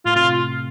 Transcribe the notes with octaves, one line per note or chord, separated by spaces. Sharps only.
A2 A3 F4
C3 C4 F4